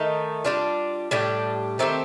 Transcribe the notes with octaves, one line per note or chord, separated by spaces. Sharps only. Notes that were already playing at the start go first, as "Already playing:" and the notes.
Already playing: D#3 A3 D#4
G3 D4 F4
A2 G3 D4 G4
D#3 A3 C4 G4